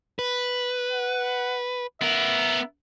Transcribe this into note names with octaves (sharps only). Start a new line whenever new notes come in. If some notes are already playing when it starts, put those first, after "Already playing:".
B4
F#5
B3 A#4 E5